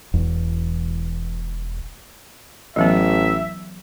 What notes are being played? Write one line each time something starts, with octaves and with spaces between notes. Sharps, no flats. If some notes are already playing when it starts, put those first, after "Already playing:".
E1 E2
A1 E3 F#3 B3 E5